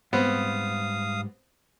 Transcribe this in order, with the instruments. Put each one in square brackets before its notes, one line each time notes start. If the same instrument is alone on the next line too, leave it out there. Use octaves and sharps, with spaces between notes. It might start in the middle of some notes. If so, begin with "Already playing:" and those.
[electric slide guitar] G#2 G3 [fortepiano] B3 C4 [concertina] F5 D#6